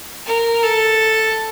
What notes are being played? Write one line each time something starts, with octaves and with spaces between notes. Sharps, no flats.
A#4
A4